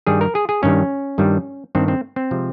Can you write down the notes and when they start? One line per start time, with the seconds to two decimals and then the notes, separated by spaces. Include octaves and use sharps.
0.07 G2 D#3 G3 G#4
0.21 A#4
0.35 G#4
0.49 G#4
0.63 G2 D#3 G3 C#4
1.18 G2 D#3 G3
1.75 G2 D#3 G3 C4
1.88 C4
2.16 C4
2.31 C3 F3 G#3